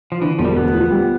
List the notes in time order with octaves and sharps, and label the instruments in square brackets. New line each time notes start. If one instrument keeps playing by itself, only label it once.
[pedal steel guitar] F3
[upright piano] D3 [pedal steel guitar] E3
[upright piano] E1 [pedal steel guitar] F3
[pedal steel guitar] G3
[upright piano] D2 [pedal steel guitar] B3
[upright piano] F3
G3